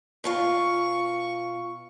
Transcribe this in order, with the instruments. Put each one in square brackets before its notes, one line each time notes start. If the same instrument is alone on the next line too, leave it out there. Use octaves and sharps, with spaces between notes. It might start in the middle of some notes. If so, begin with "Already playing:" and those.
[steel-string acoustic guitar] B2 F4 F5 [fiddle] C#6